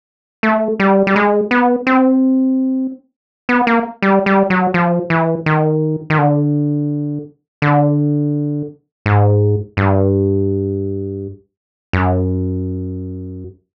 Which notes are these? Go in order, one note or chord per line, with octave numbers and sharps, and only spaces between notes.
A3
G3
G3
G#3
B3
C4
B3
A#3
G3
G3
F#3
F3
E3
D#3
D#3
D3
D3
G#2
G2
F#2